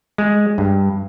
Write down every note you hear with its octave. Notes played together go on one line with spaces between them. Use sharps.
G#3
G2